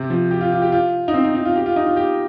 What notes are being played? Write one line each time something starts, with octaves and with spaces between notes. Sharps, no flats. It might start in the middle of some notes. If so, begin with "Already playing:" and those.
Already playing: C3
F3
G4
F4
F4
G4
F4
D#4
C4
D#4
D#4
F4
G4
F4
D#4
F4
G4